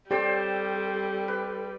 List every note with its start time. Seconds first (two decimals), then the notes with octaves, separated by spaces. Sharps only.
0.11 G3 C4 G4 A4 C5 D5
1.28 B4